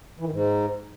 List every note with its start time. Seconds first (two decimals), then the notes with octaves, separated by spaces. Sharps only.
0.20 E3
0.25 D#3
0.31 G#2